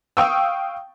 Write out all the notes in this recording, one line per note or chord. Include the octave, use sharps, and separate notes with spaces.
F5 G5 C#6 D#6 E6